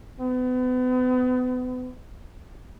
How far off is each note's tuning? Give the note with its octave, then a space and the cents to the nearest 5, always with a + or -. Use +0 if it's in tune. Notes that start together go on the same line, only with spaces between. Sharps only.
B3 +35